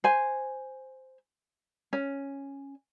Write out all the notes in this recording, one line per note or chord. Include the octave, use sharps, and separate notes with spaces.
C5 G#5
C#4